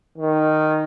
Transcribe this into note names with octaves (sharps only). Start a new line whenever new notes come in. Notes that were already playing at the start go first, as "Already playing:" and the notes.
D#3